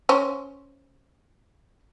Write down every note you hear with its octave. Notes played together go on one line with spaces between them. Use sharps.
C#4 C5